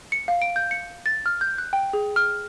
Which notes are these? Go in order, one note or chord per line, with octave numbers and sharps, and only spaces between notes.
C#7
F5
D7
G6
C#7
A6
F6
G6
F#6
G5
G#4
F6